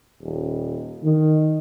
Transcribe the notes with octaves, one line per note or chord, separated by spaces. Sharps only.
D#1
D#3